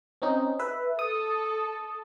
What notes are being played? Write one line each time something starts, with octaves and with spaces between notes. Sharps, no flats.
C4 C#4 D#4
B4 E5
A4 D#6